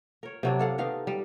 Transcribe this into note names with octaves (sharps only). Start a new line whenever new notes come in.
A#4 C#5
C3 F#3 D4
A4 F5 F#5
D#3 B3 D#4 F5
G3